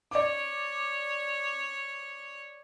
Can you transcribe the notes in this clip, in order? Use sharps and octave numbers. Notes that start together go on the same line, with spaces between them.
C#5 D5 D6